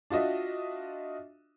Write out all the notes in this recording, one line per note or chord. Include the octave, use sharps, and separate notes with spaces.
D4 F4 F#4 D#5 E5